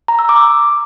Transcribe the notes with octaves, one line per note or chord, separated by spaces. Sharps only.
A#5
E6
D6